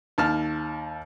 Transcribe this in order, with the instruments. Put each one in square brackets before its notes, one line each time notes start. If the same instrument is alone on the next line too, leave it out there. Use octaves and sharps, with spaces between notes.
[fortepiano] D#2 A5 F6